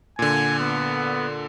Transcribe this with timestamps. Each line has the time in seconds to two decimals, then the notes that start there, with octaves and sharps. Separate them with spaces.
0.19 A#2 D3 G#5
0.59 B3